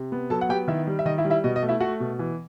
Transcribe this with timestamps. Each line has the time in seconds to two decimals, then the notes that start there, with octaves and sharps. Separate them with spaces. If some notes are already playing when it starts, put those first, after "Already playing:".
Already playing: C3
0.12 B3
0.30 F#3 A4 A5
0.41 F#5
0.49 B3 G4 G5
0.68 D#3 E4 E5
0.87 G3
0.99 E5
1.05 D#3 D#5
1.18 E4 E5
1.25 G3
1.30 E4 E5
1.44 B2 D#5
1.56 D#5
1.62 A3
1.69 E4 E5
1.80 A3 F#4 F#5
2.00 B2
2.19 E3